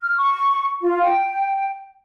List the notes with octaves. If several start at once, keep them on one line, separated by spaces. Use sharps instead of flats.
F6
C#6
F4
G5